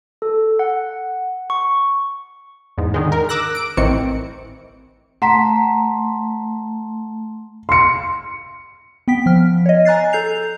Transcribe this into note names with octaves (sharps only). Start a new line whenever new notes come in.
A4
F#5
C#6
E2 G#2
D3 D#3 G#3
A#4
D6 E6 F#6 A#6
D7
A1 D#3 E3 C4 C#7
A3 F#5 A#5 C6 B6
C6 C#7
B3 G5 B6
F3 F6
C#5 D#5
G#5 A#5 F#6 A6 C7
A4 G6 C7 F7